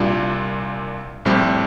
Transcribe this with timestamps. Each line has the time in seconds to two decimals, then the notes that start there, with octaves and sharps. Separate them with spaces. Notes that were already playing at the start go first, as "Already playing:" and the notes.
Already playing: C2 A#2 G3 D4 F4
1.25 A#1 A2 G3 C4 G4